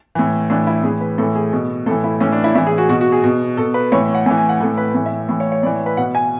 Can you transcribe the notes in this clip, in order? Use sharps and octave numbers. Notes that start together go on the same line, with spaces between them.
A2 E3
A2 E3 D4
E4
A2 E3 G#4
B4
A2 E3 A4
G#4
B2
A2 E3 A4
E4
A2 E3 C#4
D4
E4
A2 E3 E4
G#4
F#4
B2 F#4
F#4
G#4
B2
B2 A4
B4
A2 E3 C#5
F#5
A2 E3 G#5
G#5
F#5
A2 E3 A4
B4
A2 E3
E5
A2 E3
C#5
C#5
A2 E3 D5
B4
B2 F#5
G#5